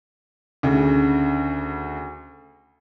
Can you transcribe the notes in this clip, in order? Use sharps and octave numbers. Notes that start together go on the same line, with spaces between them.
D2 C#3